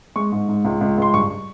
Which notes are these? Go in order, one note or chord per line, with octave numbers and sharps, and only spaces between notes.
G#3 C#6
G#2
G#2
C#2
C#2
C#2 C6
G2 C#6